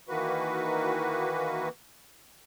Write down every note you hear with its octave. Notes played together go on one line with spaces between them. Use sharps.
D#3 E3 A#3 F#4 B4